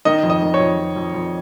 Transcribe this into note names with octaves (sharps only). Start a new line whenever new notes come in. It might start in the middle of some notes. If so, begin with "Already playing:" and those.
D#3 D#5
F2
D#5
D#3
C#5
F2
F2
F2
F2